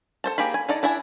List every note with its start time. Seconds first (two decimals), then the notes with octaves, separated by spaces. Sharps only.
0.24 A4 C5 A5
0.38 A#3 G4 G#4 B5
0.54 G#5
0.69 D#4 A4 D5 D#5
0.83 D4 E4 E5 G#5